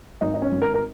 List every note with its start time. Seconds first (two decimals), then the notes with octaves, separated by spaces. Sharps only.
0.21 G#1 D#4
0.34 D#4
0.42 C#4
0.52 G#1
0.62 A#4
0.74 A#4